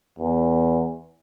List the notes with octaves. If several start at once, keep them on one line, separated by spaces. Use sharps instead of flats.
E2